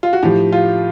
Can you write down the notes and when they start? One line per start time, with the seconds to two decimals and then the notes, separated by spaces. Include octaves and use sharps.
0.03 F4
0.13 F#4
0.23 A2 F3 G4
0.52 F4